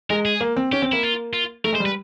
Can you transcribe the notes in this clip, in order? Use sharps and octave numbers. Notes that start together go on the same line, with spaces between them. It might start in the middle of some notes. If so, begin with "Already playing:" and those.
G#3 A#4
G#4
A#3
C4
C#4 G4
C4
A#3 E4
F4
F4
A3 A#4
G#3
C5
G3
B4